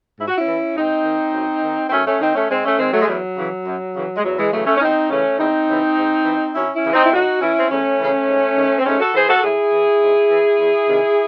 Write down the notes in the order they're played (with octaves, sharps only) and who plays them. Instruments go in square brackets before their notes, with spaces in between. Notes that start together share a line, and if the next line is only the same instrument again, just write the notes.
[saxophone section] G#2 E4
F#4
C#4 E4
E3
G#2 C4 D#4
D#3
F#2
D#3
C4
F#2 A3 C#4
A3 C#4
D#3 C4 D#4
A3 C#4
G#2 G#3 C4
A3 C#4
D#3 G#3 C4
F#3 A3
G#3
E2 F#3
C#3 E3
F#2
C#3 E3
G#3
E2 F#3
E3 G#3
C#3 E3 F#3 A3
A3 C#4
C#4
E2 C4 D#4
C#3 E3 A3 C#4
E2 C4 D#4
C#3 E3
G#2
E3
F#2 C#4 E4
C#4 E4
C#3 E3
C4 D#4
E4
A2 D#4 F#4
E3 C#4 E4
C4
E2 A3 C#4
C#3 E3
G#2
D#3
C4
G#2 A3 C#4
F#4 A4
E3 G#4 C5
F#4 A4
A2 E4 G#4
E3
G#2
E3
E2
C3 D#3